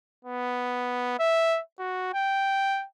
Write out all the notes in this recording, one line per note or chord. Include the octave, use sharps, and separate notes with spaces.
B3
E5
F#4
G5